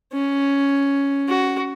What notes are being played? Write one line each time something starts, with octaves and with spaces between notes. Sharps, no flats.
C#4
F#4